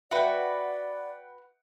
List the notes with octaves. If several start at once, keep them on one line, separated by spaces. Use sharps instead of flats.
F#4 B4 D5 E5 F#5 G5